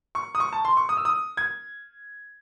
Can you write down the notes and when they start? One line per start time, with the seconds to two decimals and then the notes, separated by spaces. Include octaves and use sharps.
0.15 C#6
0.35 D#6
0.40 C#6
0.53 A5
0.65 C6
0.77 C#6
0.89 D#6
0.97 E6
1.05 D#6
1.37 G#6